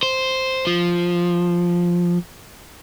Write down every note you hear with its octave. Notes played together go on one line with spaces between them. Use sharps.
C5
F3